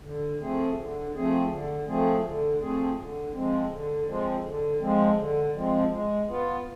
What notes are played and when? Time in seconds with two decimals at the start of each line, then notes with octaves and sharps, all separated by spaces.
0.04 D3
0.41 F3 A3 C4 G#4
0.78 D3
1.15 F3 A3 C4 G#4
1.50 D3
1.87 F3 A3 C4 G#4
2.24 D3
2.61 F3 A3 C4 G#4
2.97 D3
3.34 F3 G#3 C4
3.71 D3
4.07 F3 G#3 C4
4.44 D3
4.80 F3 G#3 C4
5.17 D3
5.54 F3 G#3 C4
5.90 G#3
6.27 B3 F4